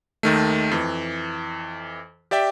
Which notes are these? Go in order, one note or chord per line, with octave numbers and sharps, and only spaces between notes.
D#2 D#3 A3
F2 E3
G4 D5 E5 G5